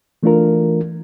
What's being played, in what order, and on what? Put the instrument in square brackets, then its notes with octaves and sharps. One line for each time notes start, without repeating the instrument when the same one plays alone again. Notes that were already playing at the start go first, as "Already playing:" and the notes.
[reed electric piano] E3 A3 D4 F4 A#4